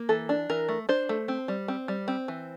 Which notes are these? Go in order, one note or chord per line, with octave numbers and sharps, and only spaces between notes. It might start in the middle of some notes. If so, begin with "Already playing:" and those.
Already playing: A#3
E3 A4
D4
E3 A#4
A3
D4 C5
A3
C4
G3
C4
G3
C4
E3